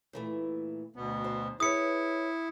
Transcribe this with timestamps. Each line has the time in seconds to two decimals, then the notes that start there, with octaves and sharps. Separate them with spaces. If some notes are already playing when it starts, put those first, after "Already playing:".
0.13 A#2 E3 A3
0.96 D2 B2 B3
1.24 C5
1.60 E4 G#4 B4 C#5 D#6 C#7